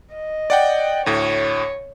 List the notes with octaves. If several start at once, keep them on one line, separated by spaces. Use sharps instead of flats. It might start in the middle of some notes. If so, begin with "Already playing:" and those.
D#5
D5 F#5 G5
D2 A2 C#5